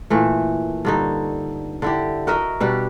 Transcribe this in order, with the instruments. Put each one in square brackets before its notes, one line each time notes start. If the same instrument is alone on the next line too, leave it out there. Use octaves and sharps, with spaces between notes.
[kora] A#2 E3 A3
G2 D3 D#4
D3 E4 G4
F#4 A#4 D#5 E5
B2 G3 D4 G4